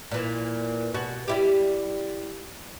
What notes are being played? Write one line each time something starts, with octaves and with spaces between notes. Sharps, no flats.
A#2 E3
B2 F#4
G3 E4 G4